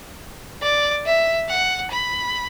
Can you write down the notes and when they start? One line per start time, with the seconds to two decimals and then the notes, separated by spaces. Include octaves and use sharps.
0.62 D5
1.06 E5
1.49 F#5
1.91 B5